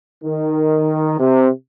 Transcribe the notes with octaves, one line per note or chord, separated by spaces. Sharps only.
D#3
C3